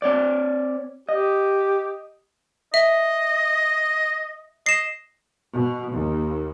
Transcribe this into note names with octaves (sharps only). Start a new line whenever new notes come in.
C4 C#5 D5
G4 D#5
D#5 E5
D#5 C7 E7
B2
D#2